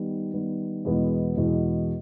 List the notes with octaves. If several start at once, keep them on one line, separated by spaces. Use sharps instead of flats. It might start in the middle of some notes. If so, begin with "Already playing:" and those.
Already playing: D#3 G3 B3
D#3 G3 B3
E2 B2 G#3 B3 E4
E2 B2 G#3 B3 E4